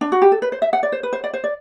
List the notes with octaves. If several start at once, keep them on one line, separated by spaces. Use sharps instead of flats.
D4
F#4
G4
A4
B4
C5
E5
F#5
D5
C5
B4
C5
D5
C5
D5